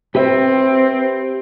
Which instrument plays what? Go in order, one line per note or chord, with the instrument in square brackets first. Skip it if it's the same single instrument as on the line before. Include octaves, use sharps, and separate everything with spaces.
[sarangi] C4 [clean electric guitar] G4 B4 E5